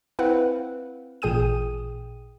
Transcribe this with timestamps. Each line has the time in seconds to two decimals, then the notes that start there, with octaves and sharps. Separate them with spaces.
0.19 C4 E4 B4 F5 F#5
1.22 A1 A#2 G#4 G5 D#6 D#7